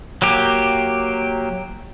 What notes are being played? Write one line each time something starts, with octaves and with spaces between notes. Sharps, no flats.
F#3 A#3 G4